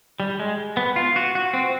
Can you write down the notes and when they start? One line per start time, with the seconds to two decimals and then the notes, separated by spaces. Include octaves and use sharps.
0.20 G3
0.40 G#3
0.77 B3
0.96 F4
1.16 F#4
1.35 F#4
1.54 C4